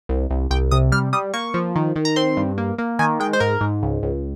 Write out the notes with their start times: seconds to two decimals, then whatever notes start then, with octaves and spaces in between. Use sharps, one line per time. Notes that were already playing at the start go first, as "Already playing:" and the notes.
0.09 C2
0.30 C2
0.51 C2 G5
0.71 C3 D#6
0.92 G3 F6
1.13 G3 D#6
1.34 A#3 C#6
1.54 F3
1.76 D#3
1.96 D#3
2.05 A#5
2.16 C4 C6
2.37 G2
2.58 A#3
2.78 A#3
2.99 D#3 G#5
3.20 G#3 G5
3.33 C5
3.40 G#2 A#4
3.61 G#2
3.82 C#2
4.03 C#2